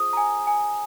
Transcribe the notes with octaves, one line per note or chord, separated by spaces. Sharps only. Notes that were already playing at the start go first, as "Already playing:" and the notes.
Already playing: F4 G#4 C5 D#6
A#5
G#5
G#5